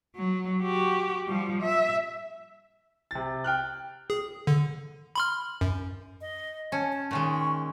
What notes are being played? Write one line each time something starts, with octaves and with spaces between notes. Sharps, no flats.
F#3
F#4 G4
F3 G3
E5
C3 A6
G5 F6 F#6
G#4
D3
B5 C6 F6
F#2
D#5
C#4 A5
A5
A#2 D#3 G#3 C#6